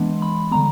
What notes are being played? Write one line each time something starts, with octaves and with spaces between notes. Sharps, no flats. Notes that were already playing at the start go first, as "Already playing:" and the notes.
Already playing: E3 G#3 B3 D4 C6
B5
D3 G3 B3 A#5